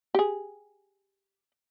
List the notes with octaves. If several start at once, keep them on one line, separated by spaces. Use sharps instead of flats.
G4 G#4